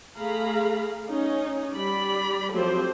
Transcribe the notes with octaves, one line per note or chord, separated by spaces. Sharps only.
A3 G#4 F5 A#5 B5
C#4 D#4
G3 D5 B5
F3 F#3 A3 C4 G4 C5